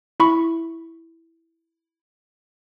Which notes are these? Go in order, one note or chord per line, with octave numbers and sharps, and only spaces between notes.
E4 B5 C#6